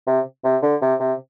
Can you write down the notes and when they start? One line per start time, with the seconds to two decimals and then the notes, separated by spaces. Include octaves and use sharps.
0.07 C3
0.44 C3
0.62 D3
0.81 C3
1.00 C3